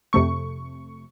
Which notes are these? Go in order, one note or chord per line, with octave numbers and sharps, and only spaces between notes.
F2 C3 A3 C#6